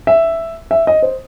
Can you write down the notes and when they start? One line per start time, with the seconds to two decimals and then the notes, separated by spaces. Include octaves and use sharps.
0.07 E5
0.71 E5
0.87 D#5
1.02 C5